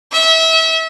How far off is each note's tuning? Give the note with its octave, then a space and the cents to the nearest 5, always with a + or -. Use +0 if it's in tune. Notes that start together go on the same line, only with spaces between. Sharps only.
E5 -30